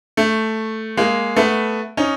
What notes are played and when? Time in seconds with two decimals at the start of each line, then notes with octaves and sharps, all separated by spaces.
0.17 A3
0.97 G#3 A#3
1.36 A3 B3
1.97 C#4 D#4